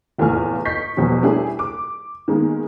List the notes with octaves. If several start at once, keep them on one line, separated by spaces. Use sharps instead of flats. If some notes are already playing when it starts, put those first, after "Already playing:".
F1 E2 A2 F4 G#5 F6
D#5 C#6 G6 B6 C7
E2 B2 F3 G3
G3 A3 D4 E4 G4 G#4
D6
D#3 G#3 A#3 B3